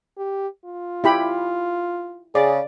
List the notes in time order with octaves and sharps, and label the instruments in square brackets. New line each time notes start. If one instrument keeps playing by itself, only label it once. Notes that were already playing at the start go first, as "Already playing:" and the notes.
[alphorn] G4
F4
[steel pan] E4 G4 B5
[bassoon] C#3 [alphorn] G#4 [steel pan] D5